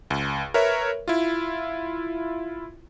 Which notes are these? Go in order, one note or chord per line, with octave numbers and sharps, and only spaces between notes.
C#2
A#4 B4 C#5 E5
E4 F4